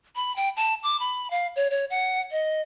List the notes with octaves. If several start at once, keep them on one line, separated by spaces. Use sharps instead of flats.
B5
G5
A5
D6
B5
F5
C#5
C#5
F#5
D#5